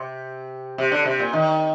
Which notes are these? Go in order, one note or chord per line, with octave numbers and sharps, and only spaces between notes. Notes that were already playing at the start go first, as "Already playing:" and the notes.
Already playing: C3
C3
D3
C3
A#2
D#3